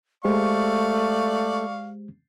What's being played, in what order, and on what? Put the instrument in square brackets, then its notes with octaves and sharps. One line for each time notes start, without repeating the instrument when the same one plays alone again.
[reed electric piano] G#3 G4 C5 [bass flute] A3 [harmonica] D5 F5 C#6